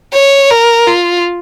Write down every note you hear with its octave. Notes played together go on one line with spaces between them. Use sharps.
C#5
A#4
F4